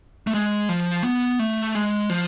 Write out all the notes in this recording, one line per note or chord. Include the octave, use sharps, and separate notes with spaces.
A3
G#3
F3
B3
A3
G#3
F3